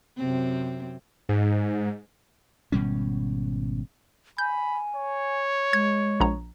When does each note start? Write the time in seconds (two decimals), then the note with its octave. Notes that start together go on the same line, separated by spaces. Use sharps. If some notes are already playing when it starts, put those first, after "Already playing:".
0.17 F#2 C3 C4
1.29 G#2
2.72 G#1 B2 G3 C#4
4.38 G#5 B5 G6
4.96 C#5
5.73 G#3 G#6
6.20 A#1 A#5